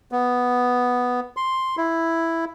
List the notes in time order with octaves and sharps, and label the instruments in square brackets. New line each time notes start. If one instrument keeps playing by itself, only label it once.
[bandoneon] B3
C6
E4